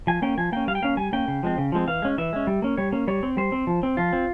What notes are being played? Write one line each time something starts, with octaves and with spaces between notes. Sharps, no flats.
F3 G#5
A#3 C#4 G5
F3 G#5
A#3 C#4 G5
G3 F5
G5
A#3 C#4 F5
G3 G#5
A#3 C#4 G5
C#3
F3 G#3 C4
C#3
F3 G#3 C4
E3 F5
G#3 C#4
E3 E5
G#3 C#4
G3
A#3 C#4
G3 C#5
A#3 C#4
G3 C#5
C4
G3 C5
C4
F3
C4
F3 F4
C4